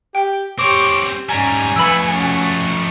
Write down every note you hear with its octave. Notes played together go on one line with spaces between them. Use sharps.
G4 G5
C4 G4 C5 C#5 D6
G#2 G3 C#4 G#5 A#5
F2 A3 B4 B5 E6
C#4 F#4